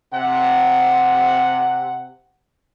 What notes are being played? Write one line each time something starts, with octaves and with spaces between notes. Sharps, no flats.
C3 F#5